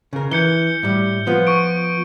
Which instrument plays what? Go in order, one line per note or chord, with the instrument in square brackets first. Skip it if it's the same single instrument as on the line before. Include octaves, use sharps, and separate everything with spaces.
[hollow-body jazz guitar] C#3 A#4
[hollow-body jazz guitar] E3 [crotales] G6 C#7 G7
[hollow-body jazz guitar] A2 G3
F3 B3
[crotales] C#6 D7